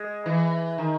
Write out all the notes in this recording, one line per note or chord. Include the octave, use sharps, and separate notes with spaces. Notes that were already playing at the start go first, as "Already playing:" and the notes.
Already playing: G#3
E3
D#3